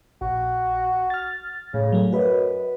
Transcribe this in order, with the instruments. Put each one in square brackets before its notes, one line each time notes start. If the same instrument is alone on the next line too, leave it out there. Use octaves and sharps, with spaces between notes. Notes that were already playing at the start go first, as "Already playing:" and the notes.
[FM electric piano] A#1 [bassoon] F#4
[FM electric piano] F6 A6
[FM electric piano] A2 [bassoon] C#3
[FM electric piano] F#3 A3
[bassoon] F#2 [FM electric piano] F#4 B4 D#5